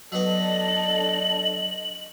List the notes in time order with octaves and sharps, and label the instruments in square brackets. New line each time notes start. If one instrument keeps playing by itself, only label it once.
[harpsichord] F#3 B3 [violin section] D4 A4 [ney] D#5 [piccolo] F#7